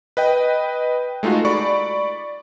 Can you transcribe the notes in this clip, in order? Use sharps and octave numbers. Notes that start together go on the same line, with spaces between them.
B4 D#5 G5
G#3 A3 D#4 F4 F#4
D5 B5 C#6